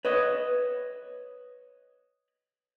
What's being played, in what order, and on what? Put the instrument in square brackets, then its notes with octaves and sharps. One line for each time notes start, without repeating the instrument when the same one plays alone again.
[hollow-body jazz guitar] B4 C#5 D#5